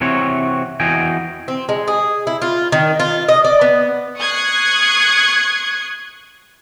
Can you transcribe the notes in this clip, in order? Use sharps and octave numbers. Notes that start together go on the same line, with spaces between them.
C3 E3 C4 F#4 C#5
E2 E3 F#4 D#5 G5 G#5
C4
G#3
G#4
E4
F4
D#3
F4
D#5
D5
B3
C#6 D#6 F#6 G#6 C7